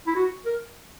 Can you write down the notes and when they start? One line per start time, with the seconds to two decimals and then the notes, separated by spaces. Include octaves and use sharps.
0.07 E4
0.16 F#4
0.45 A#4